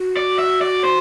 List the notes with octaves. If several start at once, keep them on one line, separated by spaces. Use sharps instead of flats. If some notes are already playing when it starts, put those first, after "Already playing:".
Already playing: F#4
D5
E5
D5
C5